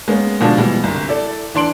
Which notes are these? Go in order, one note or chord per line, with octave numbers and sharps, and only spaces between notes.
G#3 A#3 B3 C#4
B2 D3 F3 G#3 D4 F4
B2 E3 G3 G#3
G1 C2
E4 A4 D5
E3 D4 C6 D7 F#7